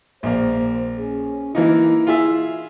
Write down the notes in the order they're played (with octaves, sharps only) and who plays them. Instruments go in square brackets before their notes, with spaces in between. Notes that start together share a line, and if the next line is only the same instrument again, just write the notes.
[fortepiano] A#1 A#3 [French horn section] C5
[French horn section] C#4 G#4
[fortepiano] E3 A#3 D#4 [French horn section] E4
[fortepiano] F4 G#4 E5